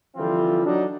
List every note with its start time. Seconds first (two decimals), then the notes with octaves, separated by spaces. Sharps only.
0.17 D3 E3 F3 G3 C4 F4
0.65 F#3 D4 D#4